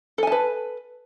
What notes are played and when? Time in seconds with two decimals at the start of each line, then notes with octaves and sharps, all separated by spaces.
0.18 A4
0.23 G#5
0.27 A5
0.32 B4